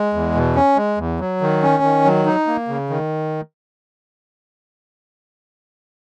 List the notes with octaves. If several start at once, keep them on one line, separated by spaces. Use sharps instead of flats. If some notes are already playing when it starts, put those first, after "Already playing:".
Already playing: G#3
E2
B2
C#4
G#3
E2
F#3
D#3
C#4
D#3
F#3
D#4
A#3
C#3
D#3